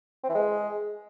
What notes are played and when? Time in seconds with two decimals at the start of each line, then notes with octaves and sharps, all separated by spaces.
0.24 C4
0.29 E3
0.35 G#3